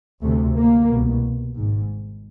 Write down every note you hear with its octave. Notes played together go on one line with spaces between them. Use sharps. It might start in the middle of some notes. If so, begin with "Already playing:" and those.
D2 C3 A3
A#3
C2 B2
G#1 G#2